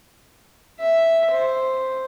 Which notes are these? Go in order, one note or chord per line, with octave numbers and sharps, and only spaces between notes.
E5
C5